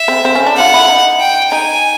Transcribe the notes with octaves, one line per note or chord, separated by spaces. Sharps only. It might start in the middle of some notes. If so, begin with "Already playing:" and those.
Already playing: E5
C4
C4
C#4
D4
F4 F#5
E4
D#4
G5
D#4 G#5